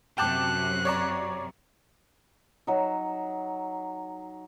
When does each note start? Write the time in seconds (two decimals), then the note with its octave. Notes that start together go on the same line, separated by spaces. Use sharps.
0.18 F#2 C3 F#3 G5 A5 D6 F#6
0.85 C#5 D5 A#5
2.67 F#3 D#4